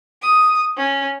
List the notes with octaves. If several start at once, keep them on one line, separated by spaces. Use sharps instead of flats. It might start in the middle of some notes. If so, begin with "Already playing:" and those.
D#6
C#4